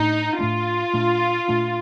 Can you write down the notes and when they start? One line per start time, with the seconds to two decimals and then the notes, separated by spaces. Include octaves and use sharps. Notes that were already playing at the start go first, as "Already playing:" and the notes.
Already playing: A2 A3 D4 D#4
0.39 A2 A3 D4 F4
0.94 A#2 A3 D4
1.48 A#2 A3 D4